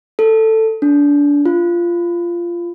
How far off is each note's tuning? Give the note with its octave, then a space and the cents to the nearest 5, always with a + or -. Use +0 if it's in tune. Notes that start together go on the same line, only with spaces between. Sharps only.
A4 +10
D4 -25
F4 -15